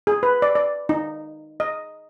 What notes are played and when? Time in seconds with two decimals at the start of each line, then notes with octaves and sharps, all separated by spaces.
0.07 G#4
0.23 B4
0.42 D5
0.55 D5
0.89 D#4
1.60 D#5